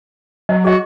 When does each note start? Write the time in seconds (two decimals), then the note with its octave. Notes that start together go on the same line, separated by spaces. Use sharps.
0.49 F#3 D#5
0.64 F#4 G#4 D#5